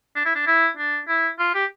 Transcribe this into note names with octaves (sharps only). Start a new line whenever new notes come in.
D4
E4
D4
E4
D4
E4
F4
G4